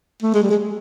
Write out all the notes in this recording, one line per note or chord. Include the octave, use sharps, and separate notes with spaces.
A3
G#3
G3
G#3